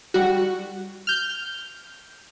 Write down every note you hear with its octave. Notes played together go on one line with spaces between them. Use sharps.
G3 F#4
F6 G6